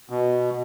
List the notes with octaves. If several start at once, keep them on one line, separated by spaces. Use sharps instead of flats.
B2